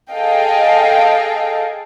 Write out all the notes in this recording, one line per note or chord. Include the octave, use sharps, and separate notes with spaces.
G#4 A4 D#5 F5 G5